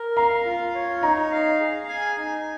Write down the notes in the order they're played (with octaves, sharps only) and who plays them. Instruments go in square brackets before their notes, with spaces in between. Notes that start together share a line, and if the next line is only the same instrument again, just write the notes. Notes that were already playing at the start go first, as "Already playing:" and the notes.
Already playing: [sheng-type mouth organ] A#4
[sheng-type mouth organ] F5 [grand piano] A#5
[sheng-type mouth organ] F4
C#5
[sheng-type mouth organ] D#4 [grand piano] A#5
[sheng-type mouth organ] F5
G#4
G#5
D#4